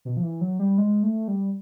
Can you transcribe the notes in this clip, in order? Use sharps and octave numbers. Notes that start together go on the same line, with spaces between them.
B2
F3
E3
F#3
G3
G#3
A3
G3